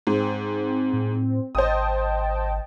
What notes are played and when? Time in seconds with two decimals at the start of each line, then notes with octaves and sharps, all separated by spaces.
0.07 G#2 C4
0.93 A2
1.55 G#1 C5 D#5 G5 A5 D#6